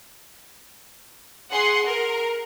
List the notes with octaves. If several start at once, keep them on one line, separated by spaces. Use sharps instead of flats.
G#4 F#5 C6
A#4